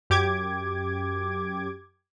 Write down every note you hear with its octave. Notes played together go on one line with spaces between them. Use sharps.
F#2 G4 D6 G#6